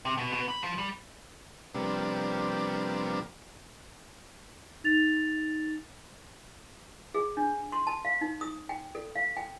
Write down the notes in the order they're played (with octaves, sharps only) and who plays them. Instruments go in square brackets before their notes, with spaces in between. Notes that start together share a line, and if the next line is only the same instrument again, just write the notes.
[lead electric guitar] C3
B2
B2
B5
F3
G3
[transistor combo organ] C3 F3 G3 A#3 B3 D4
[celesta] D#4 A6 F7
[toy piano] G#4
D4
C6
A5
F5
D#4
D#6
G5
A4
F5
G5